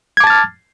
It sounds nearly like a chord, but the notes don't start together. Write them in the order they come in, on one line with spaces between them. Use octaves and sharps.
G#6 D6 A5 A6 F6